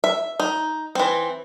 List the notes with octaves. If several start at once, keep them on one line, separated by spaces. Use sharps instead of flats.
E5
D#4
E3 C4